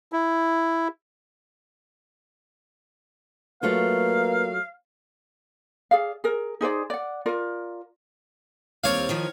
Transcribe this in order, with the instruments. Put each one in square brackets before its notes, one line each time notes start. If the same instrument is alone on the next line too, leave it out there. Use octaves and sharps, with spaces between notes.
[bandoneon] E4
[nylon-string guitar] F#3 A3 F4 [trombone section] A#3 [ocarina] B4 [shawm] F5
[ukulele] G#4 D5 F5
G#4 A#4
D#4 G#4 C5 D5
D5 F#5
F4 A#4 D5
[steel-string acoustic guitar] D#2 G3 C4 [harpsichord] C#5 F5
[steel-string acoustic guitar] D#3 F3 D#4